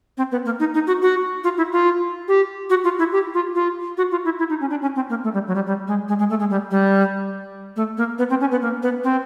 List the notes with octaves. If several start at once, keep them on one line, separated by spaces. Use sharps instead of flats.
C4
B3
A#3
D#4
D#4
F#4
F#4
F4
E4
F4
G4
F#4
F4
E4
G4
F4
F4
F#4
F4
E4
E4
D#4
C#4
D4
C#4
C4
A#3
A3
G3
F#3
G3
G3
G#3
G#3
G#3
A3
G#3
G3
G3
A3
A#3
B3
C4
C#4
B3
A#3
B3
C4